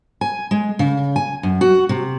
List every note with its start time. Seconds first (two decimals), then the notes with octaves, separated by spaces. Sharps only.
0.21 G#5
0.51 G#3
0.79 C#3
1.16 G#5
1.43 F#2
1.61 F#4
1.89 C3